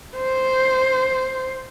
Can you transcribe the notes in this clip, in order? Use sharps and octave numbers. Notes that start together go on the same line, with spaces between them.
C5